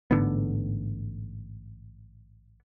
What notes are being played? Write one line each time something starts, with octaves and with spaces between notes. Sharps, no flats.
A1 G#2 D3 B3